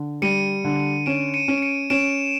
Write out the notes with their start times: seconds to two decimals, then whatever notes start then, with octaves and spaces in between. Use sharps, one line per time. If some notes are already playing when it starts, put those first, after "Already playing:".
Already playing: D3
0.22 G3 C#7 D#7
0.64 D3
1.06 C#4 D7 E7
1.34 C#7 D#7
1.48 C#4
1.58 D7
1.62 C#7 D#7
1.90 C#4 D7 E7